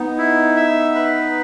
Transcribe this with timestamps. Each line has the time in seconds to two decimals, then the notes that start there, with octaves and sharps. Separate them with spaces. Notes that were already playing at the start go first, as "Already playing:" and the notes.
Already playing: B3 D#4
0.18 E4
0.56 E5
0.95 B4